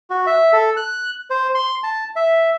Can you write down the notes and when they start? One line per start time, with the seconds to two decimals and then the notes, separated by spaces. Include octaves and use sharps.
0.10 F#4
0.27 E5
0.53 A4
0.77 F#6
1.30 C5
1.55 C6
1.84 A5
2.16 E5